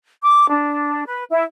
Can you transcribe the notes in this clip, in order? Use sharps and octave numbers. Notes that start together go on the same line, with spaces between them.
D6
D4
B4
E4